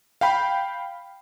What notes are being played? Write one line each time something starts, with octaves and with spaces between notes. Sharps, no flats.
F5 G5 B5